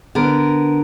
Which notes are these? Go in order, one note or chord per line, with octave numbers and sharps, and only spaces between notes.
D3 B3 A#4